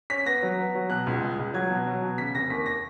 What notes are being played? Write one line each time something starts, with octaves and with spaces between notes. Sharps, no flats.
C#4 B6
B3 A#6
F#3
B3
F#3
B2 F#6
C#2
G#3
C#2
F#3 G#6
B2
F#3
B2
C#3 B6
F1 A#6
D#2 B6
A#6